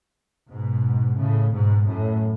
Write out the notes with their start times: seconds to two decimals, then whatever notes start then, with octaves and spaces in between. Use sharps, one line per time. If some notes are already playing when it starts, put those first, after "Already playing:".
0.51 G#2 B2
1.18 A2 C#3
1.52 G#2 B2
1.86 F#2 A2